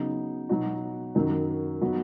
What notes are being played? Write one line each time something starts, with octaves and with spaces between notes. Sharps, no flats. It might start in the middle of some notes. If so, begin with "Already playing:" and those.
Already playing: C#3 F#3 B3 D#4
B2 F#3 B3 D#4 F#4
F#2 D#3 F#3 D#4
F#3 B3 D#4 F#4